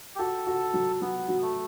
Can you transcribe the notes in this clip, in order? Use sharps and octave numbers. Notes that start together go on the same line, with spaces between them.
G4
F#4 A4
F#4
F#3
F#3 B3
F#3
A3